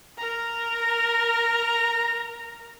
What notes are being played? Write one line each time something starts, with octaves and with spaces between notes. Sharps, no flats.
A#4 A#5